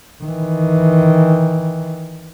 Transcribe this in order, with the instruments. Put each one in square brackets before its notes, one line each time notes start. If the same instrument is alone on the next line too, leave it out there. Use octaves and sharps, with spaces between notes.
[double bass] D#3 E3